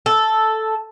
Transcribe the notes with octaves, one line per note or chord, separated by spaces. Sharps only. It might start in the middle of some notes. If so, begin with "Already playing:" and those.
A4